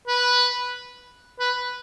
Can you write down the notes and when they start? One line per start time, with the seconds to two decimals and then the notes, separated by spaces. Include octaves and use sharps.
0.08 B4
1.39 B4